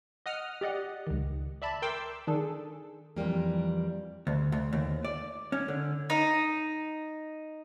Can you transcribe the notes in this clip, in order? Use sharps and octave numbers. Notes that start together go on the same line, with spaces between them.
D#5 F#5 D#6 F6
G4 D5 D#5 F#5
C#2 D#3
D5 E5 A5 B5
A#4 G5 C6 D6 E6
D#3 D4 G#4 A4
F2 E3 G3 A#3
D2
D2
D#2
D5
C#4
D3
D#4